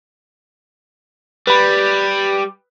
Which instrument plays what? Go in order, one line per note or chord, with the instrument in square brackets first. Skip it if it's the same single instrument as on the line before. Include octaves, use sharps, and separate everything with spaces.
[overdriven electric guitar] G3 [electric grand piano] B4 B5